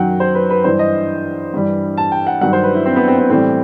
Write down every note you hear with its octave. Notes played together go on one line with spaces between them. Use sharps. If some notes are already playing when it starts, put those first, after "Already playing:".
Already playing: F#2 D#3 F#3 F#5 G5
C5
B4
B4
G2 E3 G3 C5
D#5
G2 E3 G3
A5
G5
F#5
G2 D#3 F#3 F#5
C5
B4
E4
C4
B3
C4
C4
A2 E3 G3 C4